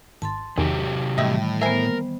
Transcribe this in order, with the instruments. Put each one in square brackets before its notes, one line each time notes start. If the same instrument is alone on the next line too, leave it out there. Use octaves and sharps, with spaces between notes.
[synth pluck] G#1 [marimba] A5 C6 A6
[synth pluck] E2 D#3 G#4 [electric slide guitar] C3 F#3 G4
[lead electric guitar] A2 [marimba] D#3 E3 G3 [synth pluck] D#5 E5
[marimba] B3 C5 [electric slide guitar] A#4 [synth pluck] E5 G#5